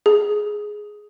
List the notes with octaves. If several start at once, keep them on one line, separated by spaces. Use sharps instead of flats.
G#4